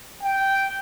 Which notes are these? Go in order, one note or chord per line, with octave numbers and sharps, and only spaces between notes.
G5